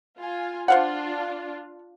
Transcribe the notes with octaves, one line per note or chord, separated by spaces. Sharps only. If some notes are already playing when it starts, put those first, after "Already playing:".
F4 G#5
D4 F4 C5 F5 F#5